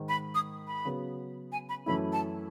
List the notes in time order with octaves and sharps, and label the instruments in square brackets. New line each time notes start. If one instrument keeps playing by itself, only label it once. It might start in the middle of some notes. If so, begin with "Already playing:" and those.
Already playing: [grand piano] G#2 D#3 G#3
[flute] B5
D#6
B5
[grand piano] C#3 F#3 B3
[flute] G#5
B5
[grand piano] F#2 E3 A3 C#4 E4 [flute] B5
[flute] A5